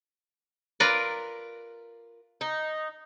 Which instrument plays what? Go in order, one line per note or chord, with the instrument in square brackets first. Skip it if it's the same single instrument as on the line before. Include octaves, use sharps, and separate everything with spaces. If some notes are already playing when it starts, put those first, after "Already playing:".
[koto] F4 A#4 B4 D5
[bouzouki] D#4